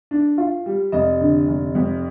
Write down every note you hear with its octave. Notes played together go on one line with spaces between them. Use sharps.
D4
F4
G3
F1 D#5
D3
F1
F2